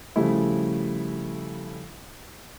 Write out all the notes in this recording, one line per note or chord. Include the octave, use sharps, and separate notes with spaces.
C#3 F3 G3 A3 E4